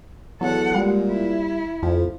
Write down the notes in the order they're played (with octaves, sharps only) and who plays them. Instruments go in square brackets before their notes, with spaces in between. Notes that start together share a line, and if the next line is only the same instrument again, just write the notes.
[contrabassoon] E2 [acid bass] F#3 [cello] A4 F#5
[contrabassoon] A#2 [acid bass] G3 [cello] G#3
[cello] E4
[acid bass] F2 [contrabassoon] F3